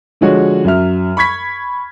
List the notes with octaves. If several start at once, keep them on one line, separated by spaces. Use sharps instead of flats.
D3 F3 G#3 F#4 C#5
F#2 F#3 E5 F6
B5 C#6 G#6 B6